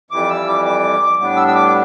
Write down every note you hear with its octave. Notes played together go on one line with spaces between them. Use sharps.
F2 E3 G3 D6
E6
D6
D6
A2 G3 B3 D4 D6
E6
E6
D6